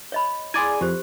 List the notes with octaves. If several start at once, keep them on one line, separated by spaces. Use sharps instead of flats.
C#5 D#5 B5
E4 G#4 D5 G#5 C6
F2 G4 C5